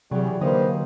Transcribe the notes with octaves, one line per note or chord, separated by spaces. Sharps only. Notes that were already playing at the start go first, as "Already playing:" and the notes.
C3 E3 F#3 G3 G#4
D3 G3 A#3 D#4 B4 C5 D#5